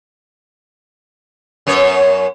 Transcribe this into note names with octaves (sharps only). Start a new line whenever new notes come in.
F#2 B3 C#5